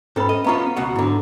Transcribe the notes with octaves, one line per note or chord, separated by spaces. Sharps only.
G#2 C#4 A4 B4 B5
D#5
B3 C#4 F4 E5 A#5 D6
C#2 B2 F#5
G#2 D3 E4